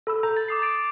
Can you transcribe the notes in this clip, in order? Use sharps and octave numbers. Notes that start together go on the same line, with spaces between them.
A4 B5 E6
A4 A#5 G6
A6
D6 D#6 C7
A6 D7